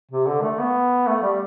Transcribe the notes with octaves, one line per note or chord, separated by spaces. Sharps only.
C3
D3
A3
B3
A3
G3